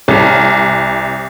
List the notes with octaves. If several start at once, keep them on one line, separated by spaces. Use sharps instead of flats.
C2